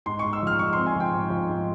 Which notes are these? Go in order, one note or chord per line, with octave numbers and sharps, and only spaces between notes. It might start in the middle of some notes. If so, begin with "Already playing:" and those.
G#2 C6
G#2 C#6
E6
F3 F6
G#2 C#6
C4 C6
G#5
F3 G5
G#2
F3
G#2